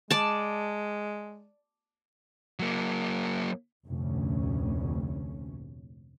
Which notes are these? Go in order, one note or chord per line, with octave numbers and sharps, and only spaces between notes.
G#3 D5 A5
F#3 A#3
F1 D2 A#2 C#4